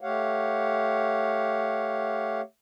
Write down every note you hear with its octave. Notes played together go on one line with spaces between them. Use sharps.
A3 G4 C#5 F5 F#5